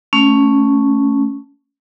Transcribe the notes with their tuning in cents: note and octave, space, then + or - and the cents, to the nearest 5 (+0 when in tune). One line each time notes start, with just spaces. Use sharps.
A3 +0 C#4 +0